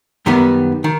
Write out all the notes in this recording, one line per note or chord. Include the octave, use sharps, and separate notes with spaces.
F#2 D#3 G3 B3
D#3